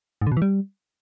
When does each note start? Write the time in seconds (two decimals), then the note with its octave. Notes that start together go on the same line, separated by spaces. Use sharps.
0.22 G#2
0.27 D3
0.32 B2
0.37 E3
0.42 G3